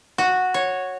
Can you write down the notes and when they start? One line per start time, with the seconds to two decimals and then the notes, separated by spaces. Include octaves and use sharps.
0.18 F#4
0.54 C#5